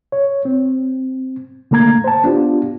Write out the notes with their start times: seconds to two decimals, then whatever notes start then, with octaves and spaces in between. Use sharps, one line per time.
0.12 C#5
0.45 C4
1.71 D3 A3 A#3 A#5 G#6
2.04 C5 A5
2.24 B3 D4 F4 G4